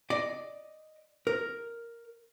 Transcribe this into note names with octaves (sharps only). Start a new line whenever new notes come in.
D5 D#5
A#4